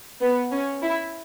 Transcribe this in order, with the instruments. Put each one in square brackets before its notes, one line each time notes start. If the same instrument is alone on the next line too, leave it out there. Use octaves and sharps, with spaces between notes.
[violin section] B3
C#4
E4